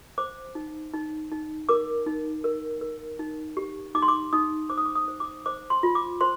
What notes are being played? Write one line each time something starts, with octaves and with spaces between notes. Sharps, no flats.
C5 D6
D#4
D#4
D#4
A#4 D6
D#4
A#4
A#4
D#4
G4
D#4 D6
C6
D6
D#4 D#6
C5 D6
D#6
D6
D#6
C5
D6
C5 D6
C6
F4
D6
C5 C6